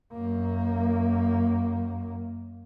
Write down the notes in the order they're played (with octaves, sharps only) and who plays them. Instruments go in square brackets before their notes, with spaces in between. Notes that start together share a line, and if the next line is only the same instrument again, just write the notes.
[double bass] F#2 A#3